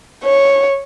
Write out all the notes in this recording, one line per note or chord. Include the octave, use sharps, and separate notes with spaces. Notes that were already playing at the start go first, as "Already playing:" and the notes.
C#5